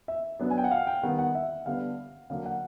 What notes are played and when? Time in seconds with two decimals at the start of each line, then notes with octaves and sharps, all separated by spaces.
0.08 E5
0.39 F#3 B3 D4
0.50 G#5
0.58 G5
0.64 F#5
0.71 F5
0.87 G5
1.03 D#3 G3 B3 F#5
1.19 F#5
1.35 E5
1.66 D3 G3 B3 D4 F5
2.30 D3 F#3 A#3 F5
2.46 F#5